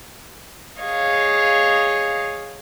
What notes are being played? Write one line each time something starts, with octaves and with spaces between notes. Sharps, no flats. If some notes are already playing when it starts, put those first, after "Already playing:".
G#4 C#5 D#5 F5